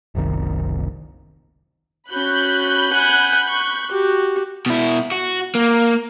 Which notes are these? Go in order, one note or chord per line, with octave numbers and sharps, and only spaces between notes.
F#1 C2 D#3
C#4 F#4 B5 F#6 G6
F#5 G#5
C#6
F#4 G4
B2 E4
F#4
A#3